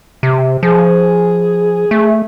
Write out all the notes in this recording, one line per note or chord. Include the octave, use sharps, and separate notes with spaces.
C3
F3 G#4
A3